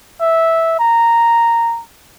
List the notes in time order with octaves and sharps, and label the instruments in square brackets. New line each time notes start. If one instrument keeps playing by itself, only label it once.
[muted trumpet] E5
A#5